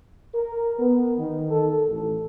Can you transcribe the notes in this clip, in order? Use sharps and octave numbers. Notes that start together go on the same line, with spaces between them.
A#4
B3
D#3
A4
A1